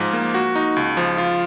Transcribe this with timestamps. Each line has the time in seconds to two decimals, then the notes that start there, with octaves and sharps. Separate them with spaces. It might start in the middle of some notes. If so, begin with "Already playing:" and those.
Already playing: G#2 F3
0.13 A#3
0.34 F#4
0.55 D#4
0.76 C#2
0.97 F3
1.18 F4